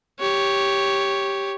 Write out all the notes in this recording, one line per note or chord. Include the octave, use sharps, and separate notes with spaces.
G4 C#5